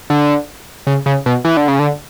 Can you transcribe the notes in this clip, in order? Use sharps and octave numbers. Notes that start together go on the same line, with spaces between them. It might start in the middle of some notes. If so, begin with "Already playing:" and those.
D3
C#3
C#3
B2
E3
D3
C#3
D3